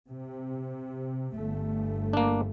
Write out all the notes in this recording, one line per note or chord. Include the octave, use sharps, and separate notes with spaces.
C3
G1 A3
A#3 D4